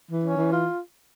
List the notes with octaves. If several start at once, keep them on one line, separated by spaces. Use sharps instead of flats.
E3
C#4
E3
F4